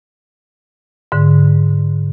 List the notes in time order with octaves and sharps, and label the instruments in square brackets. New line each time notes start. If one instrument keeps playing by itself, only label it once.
[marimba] G#2 D3